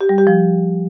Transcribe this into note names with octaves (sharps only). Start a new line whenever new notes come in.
G4
G3
G4
F3